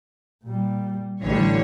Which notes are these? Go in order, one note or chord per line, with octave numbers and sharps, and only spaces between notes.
A#2 G3
A1 D3 E3 G3 C#5